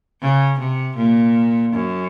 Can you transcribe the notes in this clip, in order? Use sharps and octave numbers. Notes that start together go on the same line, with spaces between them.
C#3
C3
A#2
F#2